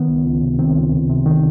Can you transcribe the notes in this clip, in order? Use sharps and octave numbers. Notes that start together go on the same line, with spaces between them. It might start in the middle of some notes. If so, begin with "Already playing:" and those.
Already playing: D#3 B3
C#2
C#2
C3
D#3 C4
C#2
C#2
C3
D#3